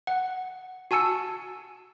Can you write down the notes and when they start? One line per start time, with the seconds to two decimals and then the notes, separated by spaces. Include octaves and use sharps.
0.07 F#5
0.91 F#4 G#5 A5 E6 C#7